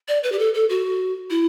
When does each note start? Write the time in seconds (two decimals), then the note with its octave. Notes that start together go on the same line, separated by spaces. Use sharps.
0.08 D5
0.23 B4
0.32 G4
0.39 A4
0.54 A4
0.69 F#4
1.30 E4